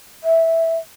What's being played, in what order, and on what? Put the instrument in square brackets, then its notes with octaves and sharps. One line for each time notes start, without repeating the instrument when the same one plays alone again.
[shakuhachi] E5